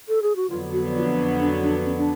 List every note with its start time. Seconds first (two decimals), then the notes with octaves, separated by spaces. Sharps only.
0.09 A4
0.22 G#4
0.36 F#4
0.49 F2 D3 F#3 B3 F4
0.73 F#4
0.96 F4
1.40 D4
1.62 D4
1.85 C#4
1.98 D4